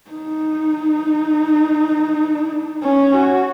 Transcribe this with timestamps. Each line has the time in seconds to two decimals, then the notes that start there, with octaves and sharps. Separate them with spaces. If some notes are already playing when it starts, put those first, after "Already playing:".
0.11 D#4
2.83 C#4
3.13 F#4